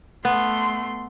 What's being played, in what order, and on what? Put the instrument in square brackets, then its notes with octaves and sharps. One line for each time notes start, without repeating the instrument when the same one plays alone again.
[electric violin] A3 C6 [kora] B3